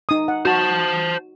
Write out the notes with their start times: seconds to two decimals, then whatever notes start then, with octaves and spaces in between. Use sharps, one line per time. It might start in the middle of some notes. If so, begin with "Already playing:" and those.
0.09 D#4 D#6
0.28 F#5
0.45 F#4 C5 A5